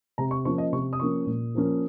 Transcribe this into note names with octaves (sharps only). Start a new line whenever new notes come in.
C3 A#5
C#6
F3 A#3 C#4 C#6
D#5
C3 C#6
D#6
F3 A#3 C#4 C#6
A#2
F3 A#3 C#4